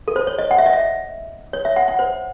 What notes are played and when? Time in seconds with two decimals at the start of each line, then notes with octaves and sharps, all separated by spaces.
0.08 A4
0.16 C5
0.27 C#5
0.38 D#5
0.51 F#5
0.58 E5
0.66 D#5
0.73 E5
1.53 C#5
1.65 E5
1.76 F#5
1.88 F#5
1.99 C5